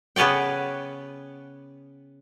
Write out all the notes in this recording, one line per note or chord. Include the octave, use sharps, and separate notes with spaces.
C#3 B3 C#4 D5 G5